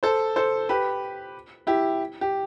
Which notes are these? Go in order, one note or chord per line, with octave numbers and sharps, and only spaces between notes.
A4 C5
A4 C5
G4 B4
E4 G4
G4